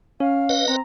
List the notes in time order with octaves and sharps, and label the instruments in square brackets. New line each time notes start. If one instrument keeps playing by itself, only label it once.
[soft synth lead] C#4 [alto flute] F5
[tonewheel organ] B4 D#5 F#5
[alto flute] C4 [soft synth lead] A#5